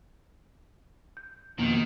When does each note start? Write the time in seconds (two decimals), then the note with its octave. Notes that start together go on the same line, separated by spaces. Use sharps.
1.17 G6
1.59 F2 B2 D#3 A#3